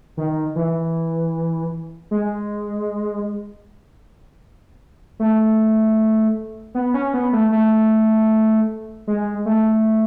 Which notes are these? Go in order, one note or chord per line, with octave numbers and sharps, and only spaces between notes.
D#3
E3
G#3
A3
B3
C#4
B3
A3
A3
G#3
A3